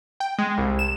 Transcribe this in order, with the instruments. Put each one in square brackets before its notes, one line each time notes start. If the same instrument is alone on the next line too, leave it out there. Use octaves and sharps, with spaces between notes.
[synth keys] G5
G#3
C2
E7